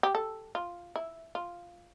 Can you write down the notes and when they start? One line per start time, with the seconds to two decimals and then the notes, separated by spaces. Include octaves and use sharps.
0.03 G4
0.15 A4
0.55 F4
0.96 E4
1.35 F4